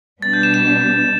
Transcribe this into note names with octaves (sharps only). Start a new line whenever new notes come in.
B2 G3 B3 D4 A6
G6
E7
E7